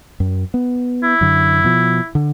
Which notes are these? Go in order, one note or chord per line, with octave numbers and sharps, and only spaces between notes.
F#2
B3
E4
F#2 D3
B2 F3
D3